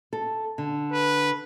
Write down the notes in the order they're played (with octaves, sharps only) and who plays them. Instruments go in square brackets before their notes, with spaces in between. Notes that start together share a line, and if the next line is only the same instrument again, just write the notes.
[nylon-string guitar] A4
D3
[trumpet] B4